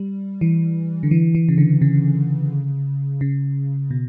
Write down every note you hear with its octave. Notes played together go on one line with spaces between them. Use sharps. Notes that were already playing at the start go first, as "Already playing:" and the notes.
Already playing: G3
E3
D3
E3
E3
C#3
D3
C#3
C#3
B2